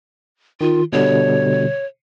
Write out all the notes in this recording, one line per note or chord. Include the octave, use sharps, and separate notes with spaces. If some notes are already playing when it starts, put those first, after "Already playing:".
D#3 F4
B2 D3 G3 C#5